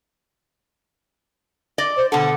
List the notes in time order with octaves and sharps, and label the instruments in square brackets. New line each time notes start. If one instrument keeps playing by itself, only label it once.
[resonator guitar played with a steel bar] D5 D#5
[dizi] C5
[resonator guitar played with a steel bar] B2 D3 A4 [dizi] F#5